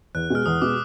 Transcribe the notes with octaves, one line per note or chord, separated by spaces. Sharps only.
E2 F#6
B2 G#3 F6
E2 D#6
B2 G#3 D6